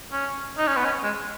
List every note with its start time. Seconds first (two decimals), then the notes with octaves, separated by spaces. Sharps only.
0.13 C#4
0.58 D#4
0.67 C#4
0.77 B3
0.85 C#4
1.03 G#3